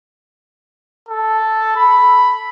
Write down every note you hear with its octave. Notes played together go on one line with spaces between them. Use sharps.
A4
B5